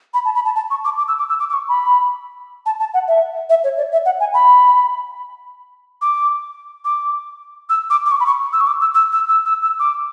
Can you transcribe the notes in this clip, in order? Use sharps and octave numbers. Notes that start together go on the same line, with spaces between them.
B5
A5
B5
A5
A5
C#6
D6
D6
E6
D6
E6
D6
D6
C#6
B5
A5
A5
F#5
E5
E5
C#5
D5
E5
F#5
G#5
B5
D6
D6
E6
D6
D6
C#6
B5
C#6
E6
C#6
D6
E6
E6
E6
E6
E6
E6
D6